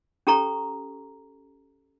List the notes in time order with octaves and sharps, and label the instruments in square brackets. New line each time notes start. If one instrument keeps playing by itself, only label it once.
[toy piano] C#4 G4 A4 A#5 C#6